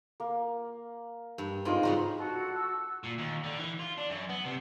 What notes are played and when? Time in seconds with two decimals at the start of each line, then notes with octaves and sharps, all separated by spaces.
0.20 A#3
1.38 G2
1.65 G#2 C4 D#4 F4 B4
1.83 C#3 G3 F#4 A#5 C6
2.16 F#4 A4
2.55 E6
3.03 A#2
3.18 D#2
3.44 D3
3.59 E3
3.79 F4
3.98 D4
4.10 F#2
4.29 B3
4.45 C3